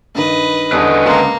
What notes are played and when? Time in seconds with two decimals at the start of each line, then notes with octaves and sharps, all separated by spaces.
0.15 G2 D#3 B4 D#5
0.72 E2 D3 G3 C#4 D4 B4 D#5
1.06 C#2 A#3 A5 C6